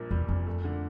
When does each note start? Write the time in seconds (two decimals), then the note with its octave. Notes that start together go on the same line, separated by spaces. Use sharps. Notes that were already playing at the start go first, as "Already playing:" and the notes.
Already playing: A#1 A#2 G3 A#3
0.11 E2 G3
0.29 F2 A#2
0.47 A3
0.64 D3